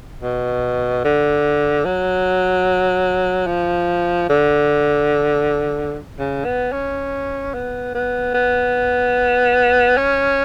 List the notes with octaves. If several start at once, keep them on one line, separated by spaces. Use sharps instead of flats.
B2
D3
F#3
F3
D3
C#3
B3
C#4
B3
B3
B3
C#4